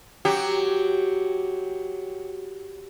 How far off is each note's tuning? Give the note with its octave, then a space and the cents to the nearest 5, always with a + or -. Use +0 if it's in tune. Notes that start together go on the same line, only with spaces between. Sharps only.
F#3 +0 G4 +0